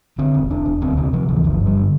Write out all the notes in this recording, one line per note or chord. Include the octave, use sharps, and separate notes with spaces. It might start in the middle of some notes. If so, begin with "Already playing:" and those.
D3 C4
E1
E1 D4
E1
D2 C4
C3 C4
C3 F3
D2 E3
G1 F3
G2
G3
D3